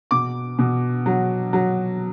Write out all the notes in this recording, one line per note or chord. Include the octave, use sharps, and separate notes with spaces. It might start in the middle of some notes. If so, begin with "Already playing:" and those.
B2 D6
B2
F#3
F#3